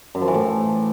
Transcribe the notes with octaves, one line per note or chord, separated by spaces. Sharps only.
F#2
F3
E3
A2